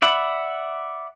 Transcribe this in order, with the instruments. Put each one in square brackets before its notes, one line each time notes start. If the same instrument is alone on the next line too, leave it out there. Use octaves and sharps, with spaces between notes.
[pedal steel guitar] D5 E5 F#5 B5